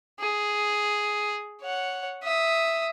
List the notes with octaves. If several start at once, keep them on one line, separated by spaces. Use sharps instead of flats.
G#4
C#5 F#5
E5 D#6